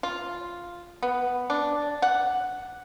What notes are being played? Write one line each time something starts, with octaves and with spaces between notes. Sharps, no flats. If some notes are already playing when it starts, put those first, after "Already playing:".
F4
B3
D4
F#5